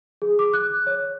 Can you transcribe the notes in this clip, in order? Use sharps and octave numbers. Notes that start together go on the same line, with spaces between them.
G#4
D6
F#6
C#5